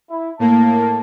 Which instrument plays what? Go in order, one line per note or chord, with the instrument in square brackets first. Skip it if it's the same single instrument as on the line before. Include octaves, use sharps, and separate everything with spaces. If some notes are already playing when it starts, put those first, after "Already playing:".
[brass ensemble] E4
[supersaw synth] A2 A#3 [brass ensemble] A5